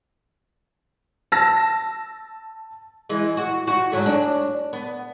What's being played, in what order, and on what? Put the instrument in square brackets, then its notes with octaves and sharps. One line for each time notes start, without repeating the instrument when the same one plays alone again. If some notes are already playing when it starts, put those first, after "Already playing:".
[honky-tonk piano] A5 E6 A#6
[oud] E3 G#3
F#4
F#4
G#2 F#3 A3
D4
B3